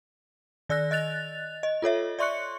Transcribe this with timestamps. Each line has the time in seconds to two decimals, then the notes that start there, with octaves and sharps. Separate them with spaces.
0.69 D#3 D5 E6 F#6 A#6
0.91 D#5 F#6 A6 F7
1.63 D#5
1.82 F4 A4 C#5 E5
2.19 D5 E5 C6 C#6 F#6 C#7